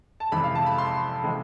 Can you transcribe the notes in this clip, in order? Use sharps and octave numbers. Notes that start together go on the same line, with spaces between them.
A5
F2 C3 E3 G#3 B5
F5
A5
B5
C6
C3 E3 G#3 C4